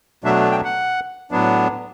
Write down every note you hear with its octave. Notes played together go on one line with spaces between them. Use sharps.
B2 F#3 A3 D4 E5
G5
F#5
A2 F#3 B3 D4